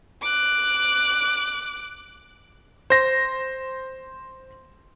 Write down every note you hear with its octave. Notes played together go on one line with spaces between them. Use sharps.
D6 F#6
C5 A#6